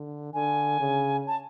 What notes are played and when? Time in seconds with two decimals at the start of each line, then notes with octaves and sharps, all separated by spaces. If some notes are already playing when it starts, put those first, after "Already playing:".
Already playing: D3
0.34 D3 G#5
0.80 C#3
1.27 A5